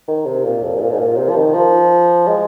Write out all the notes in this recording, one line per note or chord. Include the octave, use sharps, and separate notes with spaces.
D#3
C3
A#2
F2
G#2
A#2
G#2
A#2
C3
F3
D#3
F3
G#3